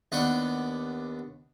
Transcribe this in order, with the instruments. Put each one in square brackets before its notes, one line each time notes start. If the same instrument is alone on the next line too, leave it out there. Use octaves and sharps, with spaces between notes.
[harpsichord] D#2 B3 D4 D5 F#5 G5